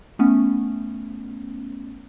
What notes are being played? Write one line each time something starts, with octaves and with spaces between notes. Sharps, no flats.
A3 B3 C#4